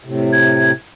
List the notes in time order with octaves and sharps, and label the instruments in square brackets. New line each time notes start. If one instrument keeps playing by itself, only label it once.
[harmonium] A2 C3
[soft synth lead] G#6